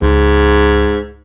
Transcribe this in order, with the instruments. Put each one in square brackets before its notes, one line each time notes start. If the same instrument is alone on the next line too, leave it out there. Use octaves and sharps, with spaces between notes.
[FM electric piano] C#2 [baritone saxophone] G#2